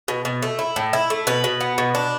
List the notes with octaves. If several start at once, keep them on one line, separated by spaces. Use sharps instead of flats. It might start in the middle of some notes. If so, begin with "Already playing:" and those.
B2
B2
A3
E4
A2
E4
A3
B2 B4
B2
B3
B2
D4